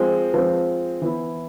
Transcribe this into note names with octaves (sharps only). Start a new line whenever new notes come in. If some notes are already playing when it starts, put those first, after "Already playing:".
Already playing: F3 G#3 C4
F3 G#3 C4
E3 B3 E4